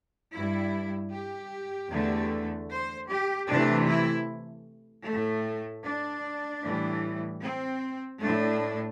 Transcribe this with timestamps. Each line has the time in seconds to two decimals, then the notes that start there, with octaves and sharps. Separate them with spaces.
0.33 G2 G3 E4
1.12 G4
1.91 E2 D3 A3
2.70 C5
3.08 G4
3.48 C3 E3 A3 D4
3.87 E4
5.06 A2 A3
5.85 D4
6.63 A2 E3 G3
7.42 C4
8.21 A2 A3 D4